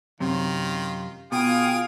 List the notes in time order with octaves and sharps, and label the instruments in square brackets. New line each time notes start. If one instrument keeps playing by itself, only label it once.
[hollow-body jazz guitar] F#2 C3 [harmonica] D#3 F4
[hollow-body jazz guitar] B2 [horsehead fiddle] F4 F5 [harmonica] G#4 D#6 [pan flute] G5